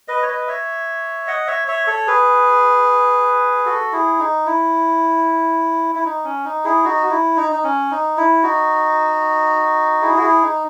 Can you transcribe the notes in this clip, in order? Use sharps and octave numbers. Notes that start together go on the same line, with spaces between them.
B4 D#5
C#5
B4 D#5
C#5 E5
D#5 F#5
C#5 E5
C#5 E5
A4 C#5
G#4 B4
F#4 A4
E4 G#4
D#4
E4
E4
D#4
C#4
D#4
E4 G#4
D#4 F#4
F#4
E4
D#4
D#4
C#4
D#4
E4
D#4 F#4
E4 G#4
F#4
E4 G#4
D#4